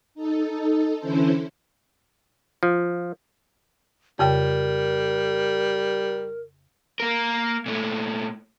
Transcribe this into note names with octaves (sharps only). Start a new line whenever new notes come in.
D#4 A4
D3 E3 C#4 E4 A4 C5
F3
F2 C#3 G3 A#4 G5
A#3 A#4
A#2 A3